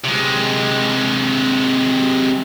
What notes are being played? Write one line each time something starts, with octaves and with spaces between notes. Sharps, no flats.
C3 G#3